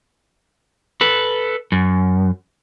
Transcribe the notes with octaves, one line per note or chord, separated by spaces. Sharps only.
A4 B4
F#2